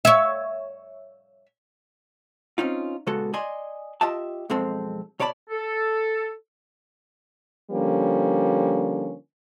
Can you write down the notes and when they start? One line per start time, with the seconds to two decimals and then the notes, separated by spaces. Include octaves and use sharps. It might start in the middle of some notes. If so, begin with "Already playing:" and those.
0.05 C#5 E5
2.58 C4 C#4 D#4 F4
3.07 A#2 C#3 G#3 B3 F#4 A4
3.33 D5 D#5 G#5 C6
4.01 F4 G4 D#5 E5 A5
4.50 B1 F2 G#3 C4 A4
5.19 B2 C#5 D5 A5 B5
5.50 A4
7.71 D3 F3 G3 A#3 C#4